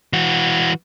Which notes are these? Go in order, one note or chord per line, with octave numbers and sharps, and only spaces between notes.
E3 F#4